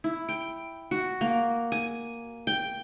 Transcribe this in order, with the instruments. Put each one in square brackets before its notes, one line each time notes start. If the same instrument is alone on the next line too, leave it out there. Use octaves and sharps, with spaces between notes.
[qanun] E4
G5
F#4
A#3
G#5
G5